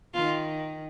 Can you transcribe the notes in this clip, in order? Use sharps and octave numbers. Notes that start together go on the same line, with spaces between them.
D#3 F4